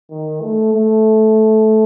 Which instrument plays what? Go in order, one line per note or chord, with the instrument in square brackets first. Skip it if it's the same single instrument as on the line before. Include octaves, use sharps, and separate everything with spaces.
[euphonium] D#3
A3
A3